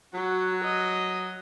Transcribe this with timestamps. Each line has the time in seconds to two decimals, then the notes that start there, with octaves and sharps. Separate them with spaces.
0.14 F#3 F#4
0.63 D#5